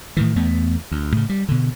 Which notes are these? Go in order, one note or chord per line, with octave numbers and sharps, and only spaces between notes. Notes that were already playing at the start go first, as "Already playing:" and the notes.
A2 D#3 E3
E2 A3 B3
D2
A2 C#3
G3
B2 D3